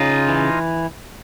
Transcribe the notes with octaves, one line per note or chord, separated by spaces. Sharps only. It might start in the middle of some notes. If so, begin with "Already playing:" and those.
Already playing: C#3 D#4 F4
E3